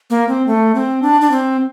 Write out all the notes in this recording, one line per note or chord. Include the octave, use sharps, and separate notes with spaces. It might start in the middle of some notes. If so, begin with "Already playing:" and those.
A#3
C4
A3
C4
D4
D4
C4